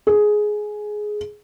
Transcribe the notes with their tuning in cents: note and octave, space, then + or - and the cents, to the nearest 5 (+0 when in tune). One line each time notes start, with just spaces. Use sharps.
G#4 +10